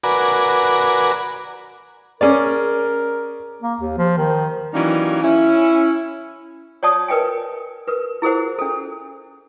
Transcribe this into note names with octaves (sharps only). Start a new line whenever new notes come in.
F#4 A#4 B4 D5 G#5
C#4 G#4 A#4 D5
A#3
D#2
F3
D#3
E3 F#3 G3 A#3 C#4 D#4
C#4 E4
C#5 D5 A5 D#6
A#4 B4 D#5 G5 G#5
A#4 B4
E4 G#4 A#4 C5 F#5
C#4 A4